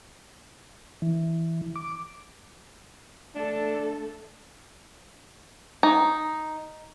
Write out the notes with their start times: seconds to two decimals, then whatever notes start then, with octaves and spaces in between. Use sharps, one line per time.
1.02 E3
1.75 D6
3.35 A3 D4 A4
5.83 D#4